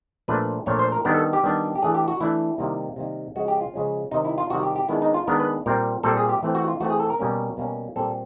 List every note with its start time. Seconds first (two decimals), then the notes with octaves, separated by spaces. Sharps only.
0.28 A#2 F3 A3 D4 B4
0.66 A#2 F3 A3 D4 C#5
0.79 C5
0.92 A#4
1.05 D#3 G3 B3 D4 A#4
1.14 A4
1.33 G4
1.43 D#3 G3 B3 D4
1.75 G4
1.82 E3 A3 D4 G#4
1.95 G4
2.08 F#4
2.21 E3 A3 D4 E4
2.58 C3 D#3 G3 A#3
2.96 C3 D#3 G3 A#3
3.35 C#3 F3 G#3 C#4 F#4
3.48 G4
3.61 F4
3.74 C#3 F3 G#3 C#4
4.11 C3 D#3 G3 D#4
4.25 E4
4.38 F4
4.50 C3 D#3 G3 F#4
4.63 G4
4.76 G4
4.88 D#3 G#3 B3 D4 E4
5.02 D#4
5.14 F4
5.28 D#3 G#3 B3 D4 A#4
5.40 B4
5.66 A#2 G3 C4 A#4
6.04 A#2 G3 C4 A4
6.17 G#4
6.29 G4
6.43 E3 A3 C4
6.55 F#4
6.68 F4
6.80 E3 A3 C4 F#4
6.90 G#4
7.00 A4
7.10 A#4
7.19 B2 G3 A#3 C#4
7.57 B2 G3 A#3 C#4
7.96 A#2 G3 C4 A4